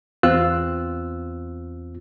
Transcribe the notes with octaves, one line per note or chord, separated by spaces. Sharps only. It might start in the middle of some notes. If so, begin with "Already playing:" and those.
E2 C4 F4 E6 F#6